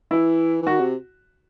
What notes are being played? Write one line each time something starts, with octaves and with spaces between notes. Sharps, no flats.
E3 E4
E3
D#3 F#4
C3